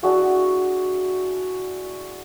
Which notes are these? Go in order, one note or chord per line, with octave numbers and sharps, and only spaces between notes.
D4 E4 F#4 G#4